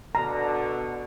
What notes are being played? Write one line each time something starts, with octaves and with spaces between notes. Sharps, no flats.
B2 D3 A#5